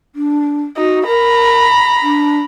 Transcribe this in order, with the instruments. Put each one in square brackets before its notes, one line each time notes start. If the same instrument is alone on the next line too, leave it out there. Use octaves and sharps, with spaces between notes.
[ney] D4
[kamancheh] D#4 [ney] F#4
[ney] A#4 [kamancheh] A#5 B5
[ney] D4